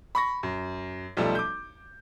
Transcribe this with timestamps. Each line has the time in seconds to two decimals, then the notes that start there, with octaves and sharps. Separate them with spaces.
0.15 B5 C#6 A#6
0.43 F#2
1.17 B1 F3 G3 A3
1.35 D6 G6